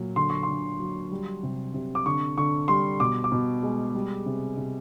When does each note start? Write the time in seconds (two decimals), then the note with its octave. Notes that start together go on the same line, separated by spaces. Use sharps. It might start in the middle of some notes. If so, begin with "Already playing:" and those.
Already playing: A#2 F#3
0.16 D3 C6
0.30 C#6
0.43 C6
0.48 D3
0.80 F#3
1.11 G3
1.43 C3
1.74 C3
1.95 D6
2.06 D3 C#6
2.38 D3 C#6
2.68 G3 C6
3.00 B2 D6
3.24 D6
3.32 B2
3.63 G#3
3.95 G3
4.26 C3
4.57 C3